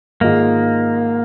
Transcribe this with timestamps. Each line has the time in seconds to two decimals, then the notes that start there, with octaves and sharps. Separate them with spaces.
0.21 G#2 D#3 G#3 A#3 F4 G#4